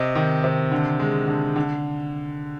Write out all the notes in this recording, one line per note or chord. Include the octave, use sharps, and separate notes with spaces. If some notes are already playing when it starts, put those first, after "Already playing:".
Already playing: C3 D#5
D#3
C3
D3
G#3
D3
D3